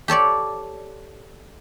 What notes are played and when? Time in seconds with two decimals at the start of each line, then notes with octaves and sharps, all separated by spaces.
0.08 G4 A4 C#5 D5